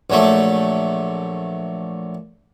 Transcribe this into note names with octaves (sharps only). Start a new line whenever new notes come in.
A#1 F#3 A3